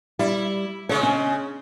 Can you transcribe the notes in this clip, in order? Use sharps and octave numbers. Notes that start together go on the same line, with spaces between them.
G3 E4
C#3 G#3 C#5
C#4